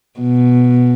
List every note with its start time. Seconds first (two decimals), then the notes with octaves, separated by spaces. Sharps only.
0.20 B2